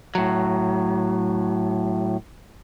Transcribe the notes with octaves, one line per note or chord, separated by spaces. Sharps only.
A2 F#3